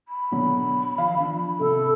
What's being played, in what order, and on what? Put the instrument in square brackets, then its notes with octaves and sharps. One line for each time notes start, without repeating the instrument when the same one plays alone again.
[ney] B5
[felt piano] B2 D3 F#3
F3 F5
F3 D4
[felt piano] C3 [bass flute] A4